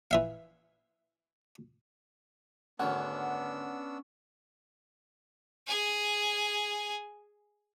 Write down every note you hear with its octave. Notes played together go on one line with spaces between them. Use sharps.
E3 E5 F5
D2 G#2 D#3 B3 C#4 D4 F#5 E6
G#4 G#5